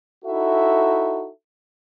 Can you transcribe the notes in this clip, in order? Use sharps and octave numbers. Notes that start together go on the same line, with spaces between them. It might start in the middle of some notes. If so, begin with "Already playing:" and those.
D#4 E4 F#4 A4 E5